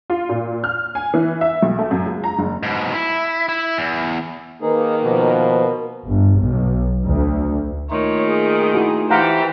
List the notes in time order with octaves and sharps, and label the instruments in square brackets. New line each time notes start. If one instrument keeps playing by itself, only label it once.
[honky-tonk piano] F4
A#2
F6
G#5
E3
E5
B1
A3
F#2
C#2
A#5
F#1
[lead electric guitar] G#2 B2
E4
E4
E2
[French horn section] D#3 A#3 B4 [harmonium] D#4 G#4 [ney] A#4
[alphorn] B2 [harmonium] F3
[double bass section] G1
B1
D2
[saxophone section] A#2 D#3 [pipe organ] A3 D#4 F4 [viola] C#5
[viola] G#4
[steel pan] E4 F#4
[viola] E3 C5 [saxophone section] G4 [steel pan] F5 F#5 A#5